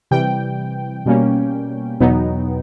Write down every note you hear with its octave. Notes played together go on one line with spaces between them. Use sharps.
C3 E3 G3 G5
B2 G3 A#3 C#4
E2 B2 F#3 B3 D#4